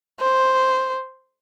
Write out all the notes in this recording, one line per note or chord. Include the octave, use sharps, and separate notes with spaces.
C5